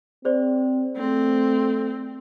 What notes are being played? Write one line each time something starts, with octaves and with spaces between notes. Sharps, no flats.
C4 G#4 C5 D5
A3 C4